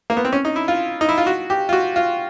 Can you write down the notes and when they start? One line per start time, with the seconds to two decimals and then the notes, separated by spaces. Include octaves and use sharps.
0.10 A#3
0.17 B3
0.25 C4
0.33 C#4
0.45 D#4
0.56 E4
0.68 F4
1.01 D#4
1.09 E4
1.18 F4
1.27 F#4
1.50 G4
1.69 F4
1.73 F#4
1.96 F4